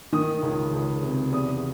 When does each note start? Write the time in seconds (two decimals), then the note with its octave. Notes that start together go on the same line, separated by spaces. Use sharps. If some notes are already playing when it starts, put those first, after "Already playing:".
0.12 D#3 D#6
0.43 C#2
0.73 C#2
1.03 C3
1.32 E2 D#6